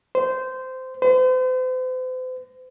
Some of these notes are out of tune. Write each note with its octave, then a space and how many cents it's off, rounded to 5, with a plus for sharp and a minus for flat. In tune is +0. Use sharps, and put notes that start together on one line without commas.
C5 -15
C5 -40